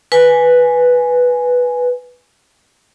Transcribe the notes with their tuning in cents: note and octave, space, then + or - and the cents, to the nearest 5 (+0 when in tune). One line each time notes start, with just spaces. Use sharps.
B4 -5 G#5 +0